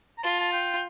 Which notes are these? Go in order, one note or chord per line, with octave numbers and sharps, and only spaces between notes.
A#5
F4 A5
A5
G5